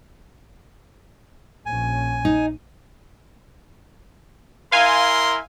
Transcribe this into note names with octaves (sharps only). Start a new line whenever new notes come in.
A#1 C#4 G#5
D#4
E4 A#4 F5 G#5 C6